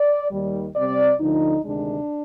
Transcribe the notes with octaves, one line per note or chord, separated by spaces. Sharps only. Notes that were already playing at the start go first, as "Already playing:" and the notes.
Already playing: D5
D#2 D#3 G3
C3 G3 C4 D5
D2 D3 F3 D#4
D2 C3 D#3 G#3 D4